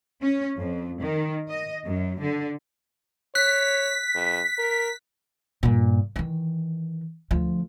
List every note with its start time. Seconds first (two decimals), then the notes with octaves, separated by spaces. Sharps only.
0.21 C#4
0.57 F2
1.00 D#3
1.48 D#5
1.85 F#2
2.21 D3
3.35 C#5 F#6 B6
4.14 F2
4.58 A#4
5.63 G2 A#2
6.16 D#3 E3
7.31 D2 F3